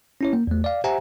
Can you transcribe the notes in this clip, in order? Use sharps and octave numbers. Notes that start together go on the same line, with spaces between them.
C#4 E4 C#5
A#3
E2 A3
D5 F5
G4 C5 E5 F#5 G#5 A#5